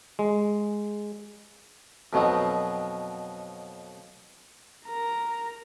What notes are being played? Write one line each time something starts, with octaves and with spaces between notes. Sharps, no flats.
G#3
F2 B2 F#3 D#4
A#4 A#5